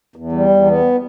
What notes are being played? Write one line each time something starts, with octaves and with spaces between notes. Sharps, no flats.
E2
G3
E2
B3